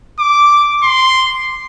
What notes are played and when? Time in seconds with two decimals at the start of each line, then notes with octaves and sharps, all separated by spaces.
0.18 D6
0.82 C6